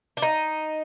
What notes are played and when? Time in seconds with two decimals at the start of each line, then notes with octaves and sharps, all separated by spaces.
0.17 D4
0.22 D#4